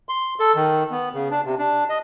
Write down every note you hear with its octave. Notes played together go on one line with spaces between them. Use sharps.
C6
A4
D#3
B3
C#3
D4
C3
D4
D#5